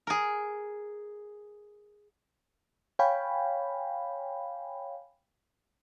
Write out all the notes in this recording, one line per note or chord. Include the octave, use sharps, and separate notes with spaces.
G#4 A#4
C#5 F5 G5 G#5 B5